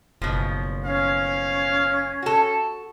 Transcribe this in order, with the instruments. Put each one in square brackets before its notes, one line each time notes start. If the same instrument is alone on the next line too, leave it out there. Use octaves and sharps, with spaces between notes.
[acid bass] F#1 [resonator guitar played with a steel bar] B2 F3
[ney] C#4 [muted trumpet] F5
[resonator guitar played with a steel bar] F#4 A4